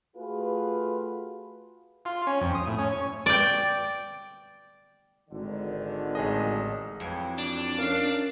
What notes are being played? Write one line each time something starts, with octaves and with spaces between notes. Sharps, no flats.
A3 F4 F#4 G#4 B4
F4
C#4
F2
D#6
A2
C#4
C#5
D5 G5
G#1 D3 D#3
A1 G#4 D#5
F2 E3 F#3
D4
C#4 A#4 F5